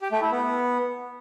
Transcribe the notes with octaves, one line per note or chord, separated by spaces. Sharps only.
G4
A3
E4
B3